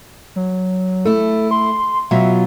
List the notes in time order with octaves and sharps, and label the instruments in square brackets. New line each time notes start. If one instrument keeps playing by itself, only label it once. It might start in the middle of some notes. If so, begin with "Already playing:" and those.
[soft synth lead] F#3
[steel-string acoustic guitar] A3 E4 [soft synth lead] A4
[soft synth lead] C6
[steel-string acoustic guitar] B2 F#3 F4 [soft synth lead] E5